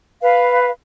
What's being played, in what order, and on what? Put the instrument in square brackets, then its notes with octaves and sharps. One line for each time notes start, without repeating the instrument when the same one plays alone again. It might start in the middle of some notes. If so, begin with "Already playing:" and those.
[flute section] B4 F5